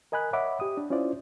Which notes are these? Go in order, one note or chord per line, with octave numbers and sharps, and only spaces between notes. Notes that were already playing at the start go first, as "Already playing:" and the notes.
A#4 D#5 G#5 B5 F#6
C#5 D#5 E5 F#5 B5 D6
G4 D#6
D4
C#4 E4 F4 C5 D5